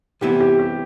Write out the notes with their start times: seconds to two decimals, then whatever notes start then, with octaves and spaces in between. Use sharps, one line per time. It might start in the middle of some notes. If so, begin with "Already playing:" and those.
0.21 C2 C3 E3 B3 E4 G4
0.40 G4
0.59 G4